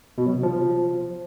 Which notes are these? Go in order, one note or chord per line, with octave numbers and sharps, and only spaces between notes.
B2
F#3
C3
F3